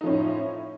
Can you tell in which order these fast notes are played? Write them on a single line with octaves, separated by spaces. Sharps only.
D#4 F3 C#4 A2